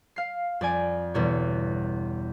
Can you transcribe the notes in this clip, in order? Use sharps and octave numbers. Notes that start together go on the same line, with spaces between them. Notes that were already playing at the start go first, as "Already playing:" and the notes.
F5 C7
F2 D5 G#5 D7
G1 E2 B2 C#5